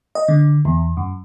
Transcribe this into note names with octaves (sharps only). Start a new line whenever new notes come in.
D#5
D3
E2
F#2